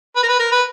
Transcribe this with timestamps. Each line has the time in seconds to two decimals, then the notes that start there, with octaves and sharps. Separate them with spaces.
0.16 B4
0.23 A#4
0.28 B4
0.39 A#4
0.52 B4